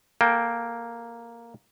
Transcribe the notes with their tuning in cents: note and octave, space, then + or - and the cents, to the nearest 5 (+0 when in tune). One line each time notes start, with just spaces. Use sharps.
A#3 +0 A4 -15 G5 +0